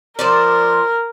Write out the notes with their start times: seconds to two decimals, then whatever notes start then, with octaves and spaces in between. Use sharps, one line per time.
0.19 F3 A#4 C5 D5